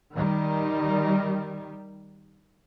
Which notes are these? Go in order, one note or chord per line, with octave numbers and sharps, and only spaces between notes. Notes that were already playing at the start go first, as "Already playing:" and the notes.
D#3 G3